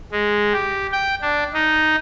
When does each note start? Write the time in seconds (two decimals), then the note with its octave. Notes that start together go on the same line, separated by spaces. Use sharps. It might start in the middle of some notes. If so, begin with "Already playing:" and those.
0.12 G#3
0.53 G4
0.92 G5
1.21 D4
1.53 D#4